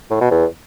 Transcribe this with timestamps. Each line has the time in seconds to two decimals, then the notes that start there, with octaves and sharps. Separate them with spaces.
0.10 A2
0.21 B2
0.31 E2